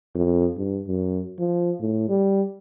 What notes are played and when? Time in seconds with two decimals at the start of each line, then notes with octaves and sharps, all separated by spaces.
0.15 F2
0.57 G2
0.87 F#2
1.39 F3
1.80 A2
2.09 G3